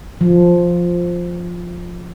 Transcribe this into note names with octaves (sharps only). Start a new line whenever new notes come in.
F3